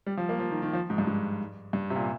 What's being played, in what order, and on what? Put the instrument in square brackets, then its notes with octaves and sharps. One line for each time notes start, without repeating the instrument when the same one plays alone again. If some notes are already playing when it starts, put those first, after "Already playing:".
[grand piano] G3
F3
A#3
F3
D#3
D#3
F3
G#2
G2
G#2
G2
C3
A#2